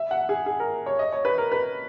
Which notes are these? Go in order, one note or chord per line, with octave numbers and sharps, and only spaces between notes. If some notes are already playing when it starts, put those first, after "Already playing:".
Already playing: E5
F#5
G#4
G#4
A#4
C#5
D#5
C#5
B4
A#4
B4